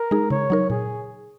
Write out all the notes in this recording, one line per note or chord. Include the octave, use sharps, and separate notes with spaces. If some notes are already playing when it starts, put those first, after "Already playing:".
Already playing: A#4
G#3 D#4 G#4
C#3 C#5
F#3 D#4 A#4
A#2 G#4